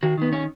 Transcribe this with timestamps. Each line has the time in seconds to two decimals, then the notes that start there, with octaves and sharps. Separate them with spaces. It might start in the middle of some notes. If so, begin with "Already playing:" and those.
0.03 D#3 F#4
0.18 D#3 B3
0.33 C#4